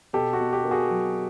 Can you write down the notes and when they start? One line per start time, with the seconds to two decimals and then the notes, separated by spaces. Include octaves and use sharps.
0.13 B2 G4 A4
0.33 F#4
0.40 B2
0.53 G4
0.65 A#3
0.71 F#4 G#4
0.90 F#3